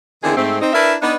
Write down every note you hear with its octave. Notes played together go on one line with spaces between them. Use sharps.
E2 D3 D#3 C4 E4 G#4
G#2 A3 C4
C4 D#4
D4 E4 A#4 B4 E5
B3 D4 D#4